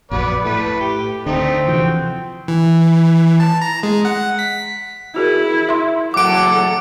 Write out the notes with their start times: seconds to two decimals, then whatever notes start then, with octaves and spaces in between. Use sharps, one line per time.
0.11 A#1 F#2 F#3 B3 B4 D5
0.45 A2 A3 B4
0.80 G4
1.26 D2 D3 A3 C4 D#4
1.67 C3 E3 F3 F#4 G5
2.48 E3
3.40 A5
3.62 A#5
3.83 G#3
4.05 F#5
4.39 B6
5.16 E4 F#4 G#4 A#4
5.69 E5 C6
6.14 F#1 A2 F#3 A4 F#5 D6 D7